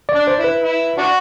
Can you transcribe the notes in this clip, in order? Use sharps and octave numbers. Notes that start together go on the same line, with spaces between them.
D5
D4
C5
E4 B4
E4
D4 F#4